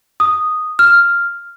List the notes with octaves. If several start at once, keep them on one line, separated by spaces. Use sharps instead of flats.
D#6
F6